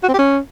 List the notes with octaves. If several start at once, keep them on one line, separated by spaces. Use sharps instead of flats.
F#4
C4
G4
C#4